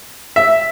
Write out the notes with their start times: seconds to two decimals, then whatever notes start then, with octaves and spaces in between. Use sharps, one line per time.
0.36 E5